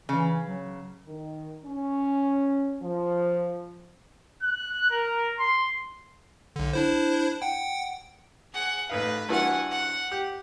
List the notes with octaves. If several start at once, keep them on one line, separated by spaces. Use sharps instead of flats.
C#3 E3
F#3
D#3
C#4
F3
F#6
A#4
C6
B1 D3
D4 E4 C5
F#5 G5
G#4 F#5
A1 D#4 B4 F5
G2 E3 F#4 F#5 G#5
F#5
G4